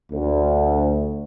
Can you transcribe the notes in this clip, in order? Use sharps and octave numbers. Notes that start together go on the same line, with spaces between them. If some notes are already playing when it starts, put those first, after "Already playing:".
D2